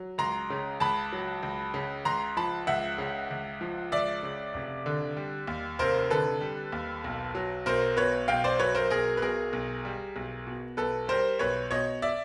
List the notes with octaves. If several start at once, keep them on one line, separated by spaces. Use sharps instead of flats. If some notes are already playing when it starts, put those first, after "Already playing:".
Already playing: F#3
C#2 A#5 C6
C#3
C#2 A5 B5
F#3
C#2
C#3
C#2 A#5 C6
F3 A5 B5
C#2 E5 F#5
C#3
C#2
F3
C#2 D5 E5
C#3
F1
D3
G3
D#2
F1 A#4 C5
D3 A4 B4
G3
D#2
B1
F#3
B1 A#4 C5
B2 B4 C#5
B1 F5 G5
C5 D5
F#3 B4 C#5
A#4 C5
B1 G#4 A#4
B4
B2 G#4 A#4
B1
G3
B1
B2
B1 A4 B4
G3 A#4 C5
B1 B4 C#5
B2 C#5 D#5
D5 E5